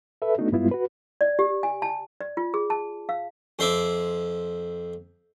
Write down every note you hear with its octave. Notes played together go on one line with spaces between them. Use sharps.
A4 B4 E5
A3 B3 D4 D#4 F#4
G2 G3 G#3 B3 E4 F4
F#4 B4
D5
G4
G#5
A5
D5
F4
G#4
A5
F5
F2 C5 E5 D6